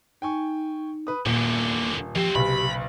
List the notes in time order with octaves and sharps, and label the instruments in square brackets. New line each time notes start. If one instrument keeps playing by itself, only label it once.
[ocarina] D#4 [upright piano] G5 G#5 C#6
[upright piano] B4 D#6
[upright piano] D#1 C#7 [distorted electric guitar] E2 D3 [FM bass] A#2 [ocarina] A#3
[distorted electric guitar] D#2 C4 [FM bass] F3 [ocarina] G4
[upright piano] F#1 B1 [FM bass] C3 [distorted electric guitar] B5